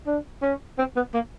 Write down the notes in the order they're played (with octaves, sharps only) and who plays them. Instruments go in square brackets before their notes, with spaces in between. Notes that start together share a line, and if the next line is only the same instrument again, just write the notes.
[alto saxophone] D4
C#4
C4
B3
A#3